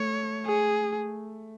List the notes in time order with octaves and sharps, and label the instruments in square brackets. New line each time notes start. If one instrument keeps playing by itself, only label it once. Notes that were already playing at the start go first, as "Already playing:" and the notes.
Already playing: [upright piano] A3 [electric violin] C#5
[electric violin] G#4